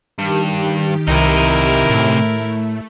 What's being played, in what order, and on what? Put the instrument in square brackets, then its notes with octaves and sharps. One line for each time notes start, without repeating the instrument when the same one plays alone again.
[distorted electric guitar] G2 [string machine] D#3 G4
[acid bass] C2 [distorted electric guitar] C3 D#4 [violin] E4 A#4
[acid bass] A2 [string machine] A3